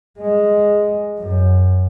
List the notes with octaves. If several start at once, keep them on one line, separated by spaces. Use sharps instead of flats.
G#3
F#2